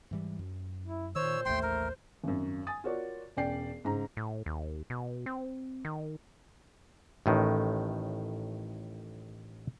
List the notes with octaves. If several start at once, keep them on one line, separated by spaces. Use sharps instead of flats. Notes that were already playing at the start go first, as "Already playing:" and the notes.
G#2 E3 G3
F#2
E4
A#2 D#3 C5 C#5 E6
A1 D#2 A3 G5 C6
A#4
G#1 F#2
G#5 D#6 A6
F4 F#4 A#4 C#5 D5
E1 C#4 D5 G5 C7
G#2 C#3 A#5
A2
D#2
B2
C4
D#3
A1 A2 D#3